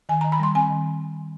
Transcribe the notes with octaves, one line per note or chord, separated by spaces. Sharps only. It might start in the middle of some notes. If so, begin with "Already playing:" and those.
D#3 G#5
A#5
D#3
B5
G3 C6
C4 G#5
D#3